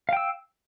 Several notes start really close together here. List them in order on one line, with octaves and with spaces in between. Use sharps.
F5 G5 E6